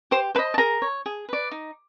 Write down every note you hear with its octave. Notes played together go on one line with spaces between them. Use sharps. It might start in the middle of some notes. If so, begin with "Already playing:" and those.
G4 C5 C6
B4 C5 D#5 B5
A5
G#4 A#4 A#5
C#5
G#4
B4 D5
D#4